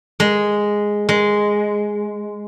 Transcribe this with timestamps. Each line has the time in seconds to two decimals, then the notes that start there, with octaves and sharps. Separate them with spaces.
0.20 G#3
1.09 G#3